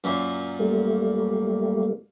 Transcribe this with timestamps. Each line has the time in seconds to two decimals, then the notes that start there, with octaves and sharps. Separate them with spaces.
0.04 F#2 A#2
0.59 G3 A3 A#3